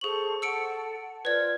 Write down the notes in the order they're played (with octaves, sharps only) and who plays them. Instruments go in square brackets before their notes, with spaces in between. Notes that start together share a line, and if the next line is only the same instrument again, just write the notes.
[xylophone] G#4 F#7 [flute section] A4 C5 C#6
[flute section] A4 F#5 A5 [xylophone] E6 C#7 D7
[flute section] F4 C5 G#6 [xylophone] B4 D5